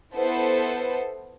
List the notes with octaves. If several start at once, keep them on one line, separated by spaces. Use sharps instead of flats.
B3 E4 A4 C5